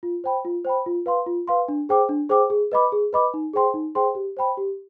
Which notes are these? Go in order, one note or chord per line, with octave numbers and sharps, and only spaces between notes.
F4
C5 G5 B5
F4
C5 G5 B5
F4
B4 F5 C6
F4
B4 F5 C6
D4
G#4 C5 G5 D6
D4
G#4 C5 G5 D6
G#4
B4 D#5 B5 D6
G#4
B4 D#5 B5 D6
D#4
G#4 C5 G5 C6
D#4
G#4 C5 G5 C6
G4
C5 G5 B5
G4